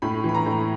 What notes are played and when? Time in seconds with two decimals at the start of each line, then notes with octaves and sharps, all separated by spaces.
0.02 A2 B5
0.24 E3 B5
0.35 A#5
0.46 A2